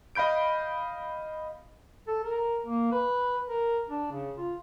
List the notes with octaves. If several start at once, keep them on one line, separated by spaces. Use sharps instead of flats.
D#5 F5 B5 G6 D7
A4
A#4
A#3
B4
A#4
D4
C#3
F4